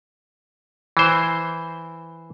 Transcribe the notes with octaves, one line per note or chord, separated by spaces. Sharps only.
E3 C5